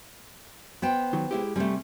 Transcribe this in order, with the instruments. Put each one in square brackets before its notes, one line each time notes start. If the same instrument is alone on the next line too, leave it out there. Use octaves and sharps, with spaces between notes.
[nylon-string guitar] B3 C5 G5
[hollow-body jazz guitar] D#3 F#3
G#3 E4 G4
[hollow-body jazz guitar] C3 G#5 [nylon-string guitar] G3 A3